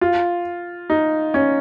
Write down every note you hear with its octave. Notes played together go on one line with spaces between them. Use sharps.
F4
D#4
C#4